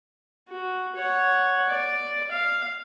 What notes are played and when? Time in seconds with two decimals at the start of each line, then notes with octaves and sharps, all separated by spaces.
0.49 F#4
0.96 C#5 F#5
1.69 D5
2.31 F5